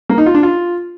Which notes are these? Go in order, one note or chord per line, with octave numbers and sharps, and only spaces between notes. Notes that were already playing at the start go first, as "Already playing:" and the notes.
A#3
D#4
F4
D4
F4